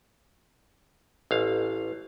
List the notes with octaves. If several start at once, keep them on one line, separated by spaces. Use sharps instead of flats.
A1 F5